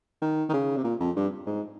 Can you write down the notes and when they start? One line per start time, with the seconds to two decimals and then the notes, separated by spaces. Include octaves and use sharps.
0.22 D#3
0.49 D#3
0.54 C#3
0.77 C3
0.84 A#2
1.00 F2
1.16 G2
1.47 G#2